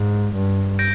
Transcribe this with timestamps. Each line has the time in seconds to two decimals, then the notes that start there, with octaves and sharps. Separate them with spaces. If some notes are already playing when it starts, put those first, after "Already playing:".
Already playing: G#2
0.35 G2
0.79 G6 A#6 D7